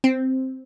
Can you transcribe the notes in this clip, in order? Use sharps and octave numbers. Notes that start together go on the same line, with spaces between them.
C4